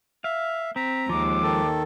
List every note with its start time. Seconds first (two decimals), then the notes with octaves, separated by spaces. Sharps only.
0.24 E5 F5
0.76 C4 A#5 B6
1.09 D#2 F3 G#3 D6
1.43 D#3 A4